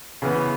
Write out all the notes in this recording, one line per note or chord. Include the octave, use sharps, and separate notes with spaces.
C#3 E3 B3